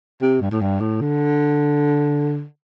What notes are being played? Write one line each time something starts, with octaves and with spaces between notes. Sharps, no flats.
C3
G2
A2
G2
A2
D3